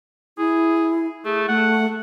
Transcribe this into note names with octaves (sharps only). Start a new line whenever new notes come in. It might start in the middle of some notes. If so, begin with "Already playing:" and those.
E4 G#4
A3 G#4
A3 F#5